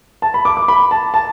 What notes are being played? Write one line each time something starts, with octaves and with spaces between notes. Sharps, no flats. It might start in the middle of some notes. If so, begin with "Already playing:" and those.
A5
B5
D6
D6
B5
A5
A5